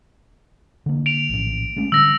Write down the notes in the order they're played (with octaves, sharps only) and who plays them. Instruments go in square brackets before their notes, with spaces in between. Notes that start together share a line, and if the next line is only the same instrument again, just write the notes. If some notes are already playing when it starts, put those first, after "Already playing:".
[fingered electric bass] D3 A#3
[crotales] D7 F7
[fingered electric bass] A#1 A2
G#3 A3 C#4
[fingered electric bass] D3 G3 D4 [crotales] E6 A#6